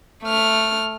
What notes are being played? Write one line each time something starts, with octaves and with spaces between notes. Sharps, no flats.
A3 F6